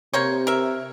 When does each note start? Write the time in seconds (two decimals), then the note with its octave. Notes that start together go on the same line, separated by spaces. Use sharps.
0.13 C3 A#3 C5 C#5
0.47 A#4 E5